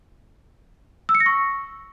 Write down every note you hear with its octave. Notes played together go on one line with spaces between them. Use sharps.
E6
C#7
A#6
C#6